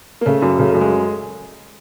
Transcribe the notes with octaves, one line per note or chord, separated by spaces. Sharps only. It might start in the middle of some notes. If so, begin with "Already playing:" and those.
A#3
C#3 A3
F#2
C#3 A3
F#2 A3
G#3